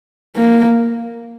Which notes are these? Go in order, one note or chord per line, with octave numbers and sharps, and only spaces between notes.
A#3